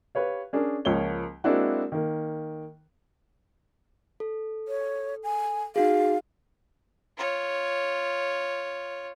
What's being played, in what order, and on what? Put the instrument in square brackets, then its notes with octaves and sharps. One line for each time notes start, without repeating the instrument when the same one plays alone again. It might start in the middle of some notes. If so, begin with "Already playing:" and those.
[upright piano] G4 B4 C#5 F5
C#4 D4 G#4 A#4
C#2 F3 A#3 C#5 G7
G#3 A#3 C4 D4 E4 F#4
D#3 A#3
[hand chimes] A4
[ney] C#5
G#5
[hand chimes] D#4 F#4 G#4 [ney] F5
[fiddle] F4 C#5